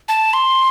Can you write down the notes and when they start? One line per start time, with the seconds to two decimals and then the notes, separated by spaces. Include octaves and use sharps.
0.08 A5
0.33 C6